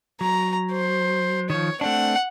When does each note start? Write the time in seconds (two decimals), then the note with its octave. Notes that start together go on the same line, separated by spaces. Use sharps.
0.21 F#3 A#5
0.72 C5
1.50 D#3 F3 C#5
1.81 A3 C4 D4 F#5